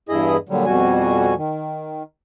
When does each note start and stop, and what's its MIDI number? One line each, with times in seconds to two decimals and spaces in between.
0.09 0.37 40
0.09 0.37 43
0.09 0.37 64
0.09 0.37 68
0.09 0.37 75
0.49 0.65 46
0.49 0.65 50
0.49 0.65 54
0.49 0.65 55
0.66 1.34 41
0.66 1.34 47
0.66 1.34 55
0.66 1.34 66
0.66 1.34 80
1.37 2.03 51